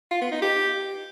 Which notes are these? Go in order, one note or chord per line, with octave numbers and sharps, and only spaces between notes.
F4
B3
D#4
G4